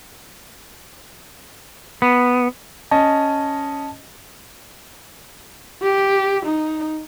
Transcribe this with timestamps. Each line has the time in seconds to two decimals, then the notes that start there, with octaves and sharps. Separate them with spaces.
2.02 B3
2.91 C#4 D#5 A5
5.83 G4
6.45 D#4